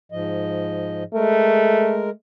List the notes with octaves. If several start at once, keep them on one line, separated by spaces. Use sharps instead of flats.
G#2 F3 D#5
G#3 A3 A#4